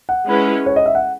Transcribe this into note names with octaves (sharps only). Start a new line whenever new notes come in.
F#5
G#3 C#4 E4 B4
C#5
D#5
E5
F#5